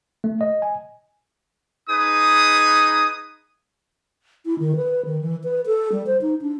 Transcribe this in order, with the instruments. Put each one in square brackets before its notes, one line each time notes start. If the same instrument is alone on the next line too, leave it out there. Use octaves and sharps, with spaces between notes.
[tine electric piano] A3
D#5
G#5
[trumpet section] D#4 G#4 B4 D#6
[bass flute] E4
D#3
B4
D#3
E3
B4
A4
G3
C5
D#4
D4